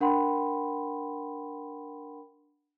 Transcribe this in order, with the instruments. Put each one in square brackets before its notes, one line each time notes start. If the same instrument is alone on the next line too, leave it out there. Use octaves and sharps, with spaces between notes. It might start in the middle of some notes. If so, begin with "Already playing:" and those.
[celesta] D4 A#4 F#5 G5 B5 C6